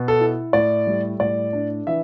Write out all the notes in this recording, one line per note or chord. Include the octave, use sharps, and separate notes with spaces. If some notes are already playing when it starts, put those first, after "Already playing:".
Already playing: B2
A4
E4
A2 D5
G3
A2 D5
D4
E3 E5